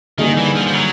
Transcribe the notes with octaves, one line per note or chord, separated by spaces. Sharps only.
D3 D#3 G3 A#3 D#4 G#4
E3
F3
F3
F#3